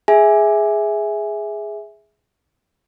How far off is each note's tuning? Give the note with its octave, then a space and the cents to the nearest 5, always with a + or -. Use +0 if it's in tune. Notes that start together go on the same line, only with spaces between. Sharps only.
G#4 +0 E5 -10 G#5 +0